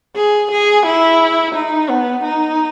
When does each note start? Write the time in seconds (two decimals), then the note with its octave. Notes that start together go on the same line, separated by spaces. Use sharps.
0.16 G#4
0.51 G#4
0.86 E4
1.55 D#4
1.89 B3
2.24 D#4